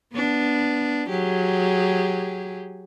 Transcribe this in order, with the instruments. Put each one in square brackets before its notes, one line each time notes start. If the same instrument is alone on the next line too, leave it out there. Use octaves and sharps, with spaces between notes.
[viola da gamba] B3 D4
F#3 G4 G#4